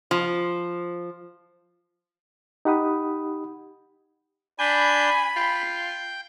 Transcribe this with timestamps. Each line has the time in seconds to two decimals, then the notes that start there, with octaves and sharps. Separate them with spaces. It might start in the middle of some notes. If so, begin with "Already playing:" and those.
0.11 F3
2.65 D#4 G4 F#5 B5 D#6
4.59 D4 G#5 B5 G6
5.36 F4 G5